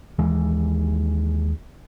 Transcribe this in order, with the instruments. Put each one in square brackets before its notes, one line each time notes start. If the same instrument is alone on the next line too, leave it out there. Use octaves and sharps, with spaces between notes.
[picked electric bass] D#2 E3 G#3